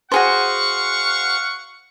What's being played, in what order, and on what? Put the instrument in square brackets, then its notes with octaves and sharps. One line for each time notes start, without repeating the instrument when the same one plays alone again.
[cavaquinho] F#4 G#4 C5 [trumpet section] F5 F#5 C#6